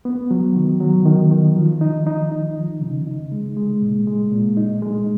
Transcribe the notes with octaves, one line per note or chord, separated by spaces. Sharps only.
B3
F#3
D#3
F#3
D#3
D#3
F3
D#4
D#4
D#4
F3
C#3
D#4
G#3
G#3
A#2
G#3
A#2
D#4
G#3